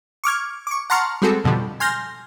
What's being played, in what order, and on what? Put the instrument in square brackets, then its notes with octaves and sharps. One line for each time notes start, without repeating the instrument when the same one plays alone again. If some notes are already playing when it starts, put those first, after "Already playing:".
[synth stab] C#6 D6 F6 G#6
C#6 D6
F#5 A5 A#5 C6 C#6 F6
G3 G#3 C4 F#4 G#4 A4
F2 B2 D3 F3 G3
G#5 C6 F6 G6 A#6